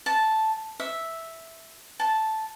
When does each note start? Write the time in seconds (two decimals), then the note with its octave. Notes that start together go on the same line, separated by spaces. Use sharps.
0.06 A5
0.80 E5
2.00 A5